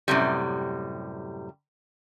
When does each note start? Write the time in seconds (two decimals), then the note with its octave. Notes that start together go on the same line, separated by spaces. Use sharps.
0.08 F#2 A2 C3 G3